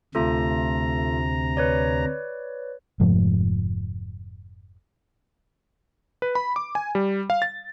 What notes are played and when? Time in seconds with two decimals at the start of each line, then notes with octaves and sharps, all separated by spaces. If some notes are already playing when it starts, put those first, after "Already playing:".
0.15 D2 C3 A3 F4 A4 A#5
1.57 B4 C#5 D5
3.00 F1 G#2 F3 A3
6.22 B4
6.35 B5
6.56 D6
6.75 G#5
6.95 G3
7.30 F5
7.42 A6